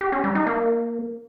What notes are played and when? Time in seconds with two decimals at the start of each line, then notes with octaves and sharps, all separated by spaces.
0.01 G4
0.12 C#4
0.24 G3
0.35 D#4
0.47 A#3